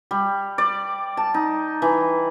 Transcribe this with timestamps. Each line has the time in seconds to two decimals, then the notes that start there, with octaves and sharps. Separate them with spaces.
0.11 G3
0.58 D5
1.17 A5
1.34 D#4
1.82 E3